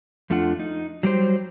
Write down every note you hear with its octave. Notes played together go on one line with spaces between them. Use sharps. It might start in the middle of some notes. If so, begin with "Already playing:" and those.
F2 A3 D4 F4 F#5
D#4
F#3 G3 G4 C5